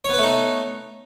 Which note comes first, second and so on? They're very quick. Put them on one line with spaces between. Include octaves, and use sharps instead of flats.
C#5 B3 B4 A3 D#4